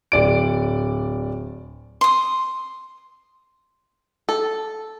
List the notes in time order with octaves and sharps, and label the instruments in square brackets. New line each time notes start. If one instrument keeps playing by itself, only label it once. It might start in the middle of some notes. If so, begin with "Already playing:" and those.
[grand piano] D1 D5 D7
[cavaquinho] C6 D#6
[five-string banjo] A4